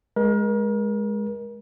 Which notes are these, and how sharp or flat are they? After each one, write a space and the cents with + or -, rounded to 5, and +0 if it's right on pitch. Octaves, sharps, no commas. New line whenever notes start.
G#3 +0 A#4 +35